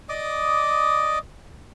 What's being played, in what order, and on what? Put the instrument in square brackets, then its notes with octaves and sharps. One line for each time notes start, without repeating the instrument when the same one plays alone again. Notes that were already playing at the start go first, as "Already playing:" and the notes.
[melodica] D5 D#5 D6 D#6